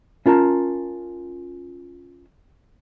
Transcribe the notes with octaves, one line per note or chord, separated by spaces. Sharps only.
C#4 F4 A#4 A5 A#5